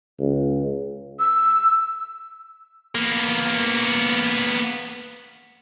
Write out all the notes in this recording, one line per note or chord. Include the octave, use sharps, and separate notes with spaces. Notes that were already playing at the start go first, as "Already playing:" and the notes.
C#2
E6
A#3 B3